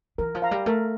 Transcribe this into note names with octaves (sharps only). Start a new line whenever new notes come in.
E3 A#4
F3
F5 A#5
G3
A3 A#4